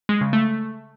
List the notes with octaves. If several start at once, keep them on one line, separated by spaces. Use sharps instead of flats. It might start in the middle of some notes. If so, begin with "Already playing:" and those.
G#3
C#3
A3